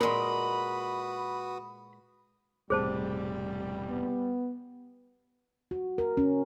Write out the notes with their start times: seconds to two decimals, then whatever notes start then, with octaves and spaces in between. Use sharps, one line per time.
0.01 A#2 G#3 F#4 A#4 B4 D#5 B5 D#6
2.70 E1 A2 C3 G3 G#4 C5 A5
3.89 B3
5.71 F#4
5.98 A#4
6.17 C#4